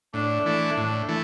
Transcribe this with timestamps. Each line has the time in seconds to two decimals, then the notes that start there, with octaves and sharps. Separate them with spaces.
0.14 A2 D4
0.46 E3 A3
0.77 A2
1.08 E3 A3